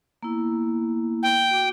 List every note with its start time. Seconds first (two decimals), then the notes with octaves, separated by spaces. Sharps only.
0.23 A#3 B3 E4
1.23 G5
1.51 F#4 D6